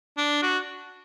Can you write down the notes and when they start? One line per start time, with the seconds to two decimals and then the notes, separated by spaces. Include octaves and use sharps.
0.17 D4
0.42 F#4